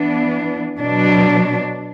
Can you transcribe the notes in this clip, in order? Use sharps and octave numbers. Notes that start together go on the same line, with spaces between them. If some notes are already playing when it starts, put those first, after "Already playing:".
Already playing: E3 B3 D4
B2 F#3 D4